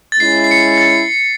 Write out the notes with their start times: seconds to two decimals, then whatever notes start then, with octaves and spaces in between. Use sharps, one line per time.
0.12 A6
0.20 G#3 C#4 E4 C7
0.44 C7
0.51 C#7
0.78 A6
0.83 C7